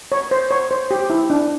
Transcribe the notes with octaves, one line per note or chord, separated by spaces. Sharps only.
C#5
C5
C#5
C5
G4
E4
D4